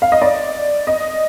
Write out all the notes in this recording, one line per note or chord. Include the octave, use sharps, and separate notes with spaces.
F5
D#5
D5
D#5